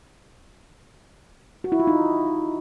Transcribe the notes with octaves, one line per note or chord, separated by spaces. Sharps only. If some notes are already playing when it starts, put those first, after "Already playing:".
F#4
E4
F4
D#4